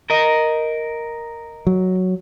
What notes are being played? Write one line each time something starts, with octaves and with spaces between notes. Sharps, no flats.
A#4 D#5
F#3